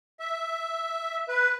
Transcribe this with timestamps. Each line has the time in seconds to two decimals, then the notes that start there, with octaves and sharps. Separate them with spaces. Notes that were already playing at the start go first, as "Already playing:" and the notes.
0.20 E5
1.29 B4